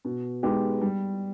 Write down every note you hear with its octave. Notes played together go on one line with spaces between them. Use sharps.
B2
G#3 B3 D#4 G4
G3